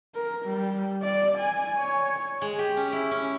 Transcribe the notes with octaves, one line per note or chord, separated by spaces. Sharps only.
A#4
G3
D5
G#5
C#5
G#3
G4
C#4
E4
C#4